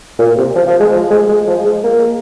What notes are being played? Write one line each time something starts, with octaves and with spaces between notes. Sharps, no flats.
A#2
C3
F3
F3
G#3
F3
G#3
G#3
F3
G#3
A#3